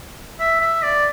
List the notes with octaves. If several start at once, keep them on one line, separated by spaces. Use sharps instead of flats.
E5
E5
D5